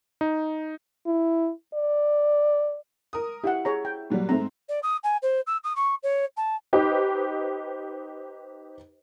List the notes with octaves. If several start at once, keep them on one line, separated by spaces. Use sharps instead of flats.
D#4
E4
D5
A#4 D#6
E4 G4 F5 F#5
G#4 C#5 A#5
G5
A#2 F#3 G3
G#2 A3 C4 A#5
D5
D#6
G#5
C5
E6
D#6
C#6
C#5
A5
D#4 G4 B4 C5 D#5